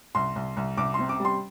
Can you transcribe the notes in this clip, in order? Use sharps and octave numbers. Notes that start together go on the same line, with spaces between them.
C2 C6
C2
C2
C2 D6
C3 C6
D6
G3
C6